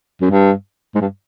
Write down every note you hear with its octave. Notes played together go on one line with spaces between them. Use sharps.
F#2
G2
G#2
G2